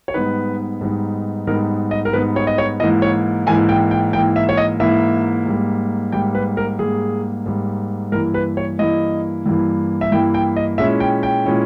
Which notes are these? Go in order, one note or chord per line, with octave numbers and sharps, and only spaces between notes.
C#5
G#2 G3 B3 D#4 B4
G#2 G3 B3 D#4
G#2 G3 B3 D#4 A#4
D#5
A#4
G#2 G3 B3 D#4 B4
C#5
D#5
C#5
G#2 E3 A#3 E4 D#5
C#5
G#2 E3 A#3 E4 G#5
G5
G5
G#2 E3 A#3 E4 G5
E5
C#5
D#5
G#2 E3 A#3 E4 E5
G#2 G3 A#3
G#2 G3 A#3 G5
B4
A#4
G#2 G3 A#3 G#4
G#2 G3 A#3
G2 E3 A#3 E4 A#4
B4
C#5
G2 E3 A#3 E4 D#5
G2 E3 A#3 E4
E5
G2 E3 A#3 E4 G5
G5
D#5
A#2 G#3 C#4 E4 E5
G5
G5
A#2 G#3 C#4 E4